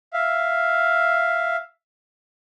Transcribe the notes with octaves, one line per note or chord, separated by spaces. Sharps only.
E5 F5